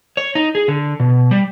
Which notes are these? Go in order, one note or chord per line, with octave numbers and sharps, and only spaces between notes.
C#5
D#4
G#4
D3
B2
G3